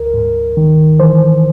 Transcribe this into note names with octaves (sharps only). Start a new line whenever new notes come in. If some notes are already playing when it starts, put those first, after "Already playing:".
Already playing: D2 A#4
G#2
D#3
E3 C5